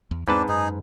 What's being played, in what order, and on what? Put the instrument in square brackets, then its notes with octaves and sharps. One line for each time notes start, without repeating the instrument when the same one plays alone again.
[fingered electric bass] E2
[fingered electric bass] E2 G#3 C4 [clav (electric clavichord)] G#2 B4 A5 [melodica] D4
[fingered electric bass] F#2 [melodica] D#4 G#4